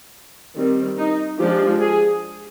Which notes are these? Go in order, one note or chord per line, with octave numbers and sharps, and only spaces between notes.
D#3 G3 C4
D#4
F3 G#3 D4 G4
G#4